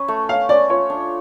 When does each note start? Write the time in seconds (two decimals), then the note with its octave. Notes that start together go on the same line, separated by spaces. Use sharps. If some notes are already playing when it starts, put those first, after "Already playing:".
Already playing: C#4 B4
0.08 A3
0.29 C#4 F5
0.49 C#4 D5
0.69 F4 C#5
0.90 D4